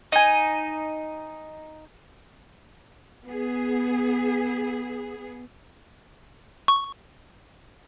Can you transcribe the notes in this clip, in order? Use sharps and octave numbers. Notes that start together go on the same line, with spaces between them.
D#4 G#5
B3 G#4
C#6